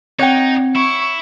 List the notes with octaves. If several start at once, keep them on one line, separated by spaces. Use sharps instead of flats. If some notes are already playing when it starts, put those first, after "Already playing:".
C4 D#4 C#5 F#5 G5
E4 C#6